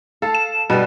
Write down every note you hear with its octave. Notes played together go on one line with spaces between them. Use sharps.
A4 F5 A5
E7
G2 B2 G3 B4